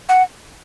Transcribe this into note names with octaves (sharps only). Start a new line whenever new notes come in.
F#5